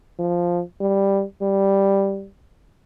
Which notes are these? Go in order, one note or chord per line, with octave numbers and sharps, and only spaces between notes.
F3
G3
G3